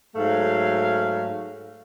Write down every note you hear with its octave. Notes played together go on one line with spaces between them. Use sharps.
G#2 F#3 A3 F5